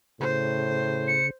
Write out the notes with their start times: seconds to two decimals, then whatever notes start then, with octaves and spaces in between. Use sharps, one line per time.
0.20 A2 C#3 C5
1.08 C#7